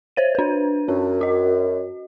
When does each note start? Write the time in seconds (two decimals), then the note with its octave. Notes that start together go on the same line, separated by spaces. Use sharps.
0.16 C5 C#5 D#7
0.35 D4 B4
0.88 F#2 C#4
1.21 F#4 D#5